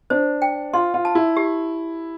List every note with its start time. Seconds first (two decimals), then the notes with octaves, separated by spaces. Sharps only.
0.10 D4 C5
0.42 G5
0.73 F4 C6
0.94 F4
1.05 A5
1.15 E4
1.37 G4